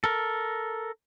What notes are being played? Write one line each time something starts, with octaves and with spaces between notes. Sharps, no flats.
A4 A#4